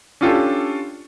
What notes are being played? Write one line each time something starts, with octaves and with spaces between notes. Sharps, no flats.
C#4 D4 F4 G4 A4